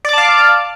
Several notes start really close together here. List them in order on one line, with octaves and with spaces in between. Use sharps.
D5 D6 A5 F5